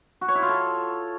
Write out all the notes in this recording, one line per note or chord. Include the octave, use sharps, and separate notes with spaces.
F#4
C#5
E4
F4
A4